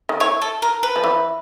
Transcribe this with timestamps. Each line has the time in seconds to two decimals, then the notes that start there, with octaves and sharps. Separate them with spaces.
0.09 D#3
0.20 E3 C#5
0.42 A4
0.62 A#4
0.83 B4
0.96 F3
1.04 E3